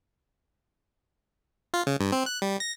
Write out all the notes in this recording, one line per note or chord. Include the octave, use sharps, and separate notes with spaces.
F4
C#3
G2
C4
F#6
G3
A#6